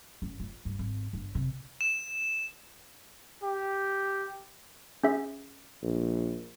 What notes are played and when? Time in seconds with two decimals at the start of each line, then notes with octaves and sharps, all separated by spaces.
0.22 F#2
0.40 F4
0.65 G2
0.79 G#1
1.13 G1
1.35 C3
1.81 E7
3.43 G4
5.03 C#4 G#4 E5
5.82 A#1